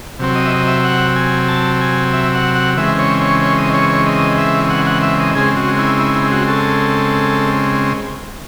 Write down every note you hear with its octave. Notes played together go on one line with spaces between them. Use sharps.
C3 F#3 C4
D#5
E5
D#5
E5
F#5
G#5
A5
G#5
E5
F#5
F#5
C#3 E3 G#3 C4 E5
C#5
C#5
C#5
D#5
C#5
C#5
D#5
E5
F#5
F#5
E5
D#5
C#3 G#3 C4 G#4
F#4
E4
E4
E4
F#4
A4